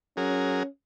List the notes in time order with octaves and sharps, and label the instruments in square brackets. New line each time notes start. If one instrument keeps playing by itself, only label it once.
[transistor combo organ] F#3 G#4 A#4 [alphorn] C#4